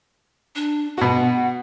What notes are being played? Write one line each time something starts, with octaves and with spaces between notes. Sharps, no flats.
D4
B2 F#4 F#5